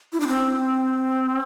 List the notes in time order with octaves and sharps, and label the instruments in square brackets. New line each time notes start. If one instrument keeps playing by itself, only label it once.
[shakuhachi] E4
D4
C4